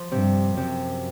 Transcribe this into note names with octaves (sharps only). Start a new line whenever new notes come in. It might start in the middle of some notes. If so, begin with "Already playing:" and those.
Already playing: F3
G2 C3
F#2 C3